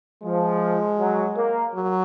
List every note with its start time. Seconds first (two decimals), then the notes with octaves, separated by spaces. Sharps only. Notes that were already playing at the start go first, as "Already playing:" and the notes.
0.23 F3 G#3
0.99 F#3
1.37 A#3
1.75 F#3